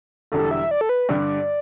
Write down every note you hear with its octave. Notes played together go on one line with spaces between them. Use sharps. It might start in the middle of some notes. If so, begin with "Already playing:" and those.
E1 E2 D3 G3 A4
E5
D5
A4
B4
G2 D3 G3 D5